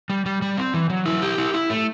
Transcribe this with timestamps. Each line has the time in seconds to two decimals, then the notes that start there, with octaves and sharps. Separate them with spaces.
0.10 G3
0.26 G3
0.42 G3
0.57 C4
0.74 E3
0.90 F#3
1.06 E4
1.22 G4
1.38 E4
1.54 E4
1.70 A3